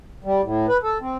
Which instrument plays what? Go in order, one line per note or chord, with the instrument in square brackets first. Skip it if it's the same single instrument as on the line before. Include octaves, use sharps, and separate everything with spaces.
[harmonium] G3
A2
B4
A4
C4